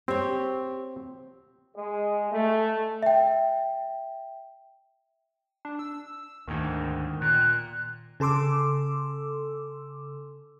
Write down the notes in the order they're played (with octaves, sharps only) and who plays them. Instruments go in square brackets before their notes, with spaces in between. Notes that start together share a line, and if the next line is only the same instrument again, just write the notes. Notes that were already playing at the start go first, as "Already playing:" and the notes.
[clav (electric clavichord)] C4 [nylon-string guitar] G4 C#5
[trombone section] G#3
A3
[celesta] E5 G5
[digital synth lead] D4
E6
[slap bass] D2 G#2 [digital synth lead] D#3
[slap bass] A#2 [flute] F#6
[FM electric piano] C#3 A4 C6 D6 E6